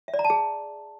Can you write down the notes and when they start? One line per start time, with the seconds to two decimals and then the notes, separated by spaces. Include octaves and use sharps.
0.08 E5
0.14 D5
0.19 A#5
0.24 A5
0.30 G#4